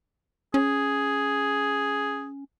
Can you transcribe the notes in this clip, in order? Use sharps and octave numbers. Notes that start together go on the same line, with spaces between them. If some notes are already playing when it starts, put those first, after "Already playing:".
C#4 G#4